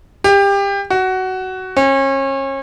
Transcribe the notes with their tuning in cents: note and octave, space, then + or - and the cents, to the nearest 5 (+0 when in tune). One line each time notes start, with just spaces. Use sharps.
G4 +25
F#4 +15
C#4 -35